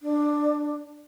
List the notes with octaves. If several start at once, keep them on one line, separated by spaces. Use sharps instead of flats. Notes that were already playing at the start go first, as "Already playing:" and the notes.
D4